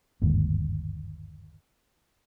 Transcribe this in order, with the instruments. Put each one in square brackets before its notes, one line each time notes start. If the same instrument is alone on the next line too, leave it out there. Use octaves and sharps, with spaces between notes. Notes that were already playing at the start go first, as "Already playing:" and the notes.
[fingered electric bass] G1 D#2 G#2